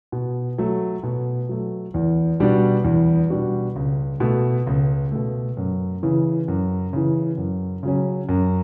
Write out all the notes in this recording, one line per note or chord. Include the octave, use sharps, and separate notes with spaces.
B2
F#3 A3
B2
F#3 A3
E2
B2 G3 D4 F#4
E2
B2 G3 D4 F#4
C#2
B2 A3
C#2
B2 A3
F#2
C#3 E3
F#2
C#3 E3
F#2
C#3 F#3 C#4
F#2